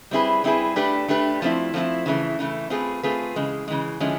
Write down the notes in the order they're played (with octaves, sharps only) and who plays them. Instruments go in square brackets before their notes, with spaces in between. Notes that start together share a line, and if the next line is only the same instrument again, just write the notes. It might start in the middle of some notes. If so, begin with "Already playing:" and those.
[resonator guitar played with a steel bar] G3 C4 E4 G#4 B4
G3 C4 E4 G#4 B4
A3 D4 G4 B4
A3 D4 G4 B4
F3 A3 C4 E4
F3 A3 C4 E4
C#3 E3 A3
C#3 E3 A3
A3 C4 F4 G#4 B4
A3 C4 F4 G#4 B4
C#3 E3 G#3
C#3 E3 G#3
D3 F3 G#3 C#4 E4